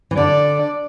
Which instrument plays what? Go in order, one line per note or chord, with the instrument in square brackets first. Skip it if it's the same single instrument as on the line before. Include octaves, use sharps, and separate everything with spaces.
[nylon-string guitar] E3
[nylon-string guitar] D3 [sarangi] D5